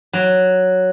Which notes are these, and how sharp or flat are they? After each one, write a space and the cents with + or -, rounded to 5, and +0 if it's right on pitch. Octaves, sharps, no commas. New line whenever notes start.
F#3 +0